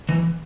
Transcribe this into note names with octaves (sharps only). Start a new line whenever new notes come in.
E3